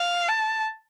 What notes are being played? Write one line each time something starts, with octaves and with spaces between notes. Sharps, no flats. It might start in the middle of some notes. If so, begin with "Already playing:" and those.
Already playing: F5
A5